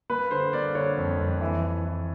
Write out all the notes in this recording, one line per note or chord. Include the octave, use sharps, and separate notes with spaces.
A#3 B4
D3 C5
A#3 D5
D3 C#5
F2
F2
E3
E3
E3